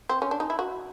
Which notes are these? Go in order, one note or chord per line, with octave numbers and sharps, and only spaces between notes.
C4
C#4
D4
D#4
E4
F#4